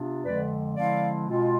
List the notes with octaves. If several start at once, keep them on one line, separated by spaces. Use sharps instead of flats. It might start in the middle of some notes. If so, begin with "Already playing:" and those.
Already playing: C3 B3 D4 F4
F2 D3 F3 G#3 C4 B4 D5
D3 F3 G#3 C4 E4 D5 F5
B2 G#3 C4 F4